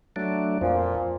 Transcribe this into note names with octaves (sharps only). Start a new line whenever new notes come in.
F#3 A3 D4
F2 A#2 F3